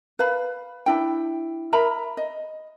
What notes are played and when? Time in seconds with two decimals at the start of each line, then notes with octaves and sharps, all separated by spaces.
0.19 B4 F5 B5
0.86 D4 E4 G5
1.73 A#4 E5 A#5 B5
2.17 D#5